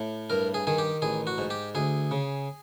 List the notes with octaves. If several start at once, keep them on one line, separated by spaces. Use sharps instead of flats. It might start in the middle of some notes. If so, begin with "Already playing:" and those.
Already playing: A2
G2 A#4
G#4
D#3 G#4
G4
A1 G#4
F#4
G#2
G4
D2 G#4
C#3